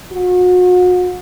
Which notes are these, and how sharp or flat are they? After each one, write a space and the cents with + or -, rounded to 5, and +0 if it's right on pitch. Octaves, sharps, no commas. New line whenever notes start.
F#4 -40